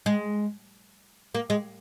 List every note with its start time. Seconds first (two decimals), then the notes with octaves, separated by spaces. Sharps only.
0.06 G#3
1.35 A#3
1.50 G#3